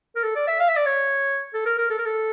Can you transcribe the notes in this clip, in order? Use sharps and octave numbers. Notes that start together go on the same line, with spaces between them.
A#4
A4
D5
E5
F5
E5
D5
C#5
A4
A#4
A#4
A4
A#4
A4